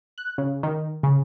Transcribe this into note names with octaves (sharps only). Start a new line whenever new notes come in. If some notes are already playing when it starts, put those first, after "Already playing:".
F#6
C#3
D#3
C#3